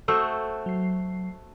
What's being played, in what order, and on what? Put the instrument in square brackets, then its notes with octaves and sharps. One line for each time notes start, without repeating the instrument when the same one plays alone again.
[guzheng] A3 F#4 C5 [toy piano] A4 E6
[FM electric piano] F#3 C7